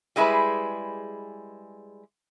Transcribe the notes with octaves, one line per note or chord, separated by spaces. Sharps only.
G3 G#3 E4 F#4 G#4 B4